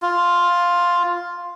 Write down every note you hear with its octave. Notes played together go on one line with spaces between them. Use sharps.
F4